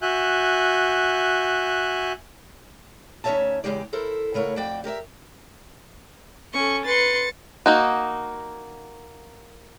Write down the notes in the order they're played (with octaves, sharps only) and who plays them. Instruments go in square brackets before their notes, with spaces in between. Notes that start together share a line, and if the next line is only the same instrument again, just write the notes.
[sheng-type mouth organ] F#4 E5 G#5 F#6 G6
[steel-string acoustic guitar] D2 C#4 D#4 C#5 E5 A5
E2 A#2 C#3 G#3 G4 D5
E4 A4 A#4 C5
C#3 A3 A#4 C#5 F#5
F2 F#4 D5 G5
G4 A#4 D5 E5
[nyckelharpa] C#4 A4 [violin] C#6
[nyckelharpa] B4 C6 [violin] A6 C#7
[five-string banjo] A#3 D#4 F#4